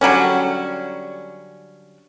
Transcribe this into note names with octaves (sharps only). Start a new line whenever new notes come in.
D3 F#3 G3 C#4